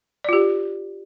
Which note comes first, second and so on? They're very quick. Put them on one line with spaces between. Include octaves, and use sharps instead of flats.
D5 F4 G4